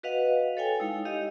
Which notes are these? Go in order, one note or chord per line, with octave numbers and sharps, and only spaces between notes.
F#4 B4 D#5 F5 F#5
A4 C#5 F5 G5 G#5
G#3 D#4 E4
G4 D#5 F5